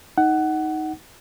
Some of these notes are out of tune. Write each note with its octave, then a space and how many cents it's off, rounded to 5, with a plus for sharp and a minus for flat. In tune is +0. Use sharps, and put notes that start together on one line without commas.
D#4 +10 F#5 +15